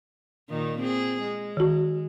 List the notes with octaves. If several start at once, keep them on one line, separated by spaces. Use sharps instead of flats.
A#2 D#3 D#4
C4 G#4
G#3
D#3 F#4